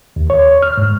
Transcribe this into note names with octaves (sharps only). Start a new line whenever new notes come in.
D#2
C#5
F6
G#2